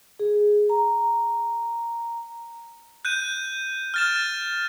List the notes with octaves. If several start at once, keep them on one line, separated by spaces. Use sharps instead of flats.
G#4
A#5
F#6 G6 D#7
F6 A6 E7